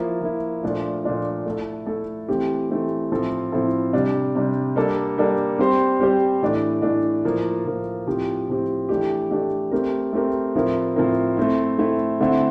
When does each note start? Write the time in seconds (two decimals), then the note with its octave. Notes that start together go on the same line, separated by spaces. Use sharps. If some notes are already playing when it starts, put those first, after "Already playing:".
Already playing: F3 A#3 E4
0.22 F3 A#3 E4
0.63 A#2 F3 A3 D4 F4
1.04 A#2 F3 A3 D4 F4
1.46 A3 E4 A4
1.86 A3 E4 A4
2.28 E3 A3 C4 G4
2.70 E3 A3 C4 G4
3.11 A2 F3 C4 E4 A4
3.52 A2 F3 C4 E4 A4
3.93 C3 G3 D4
4.35 C3 G3 D4
4.76 G3 A#3 D4 A4
5.18 G3 A#3 D4 A4
5.58 G3 C4 G4 C5
6.00 G3 C4 G4 C5
6.42 A2 E3 A3 D4
6.82 A2 E3 A3 D4
7.24 A2 F3 A#3
7.66 A2 F3 A#3
8.07 A2 F3 C4 G4
8.48 A2 F3 C4 G4
8.89 E3 A3 D4 G4
9.31 E3 A3 D4 G4
9.71 A3 C4 G4 A#4
10.13 A3 C4 G4 A#4
10.55 A2 F3 C4 E4 A#4
10.96 A2 F3 C4 E4 A#4
11.37 A3 C4 E4
11.79 A3 C4 E4
12.20 D3 A3 C4 E4